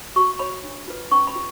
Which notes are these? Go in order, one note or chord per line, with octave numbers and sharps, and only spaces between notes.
F#4 C#6
C#5 B5
D4
F4 B4
C#4 C#6
B5
F4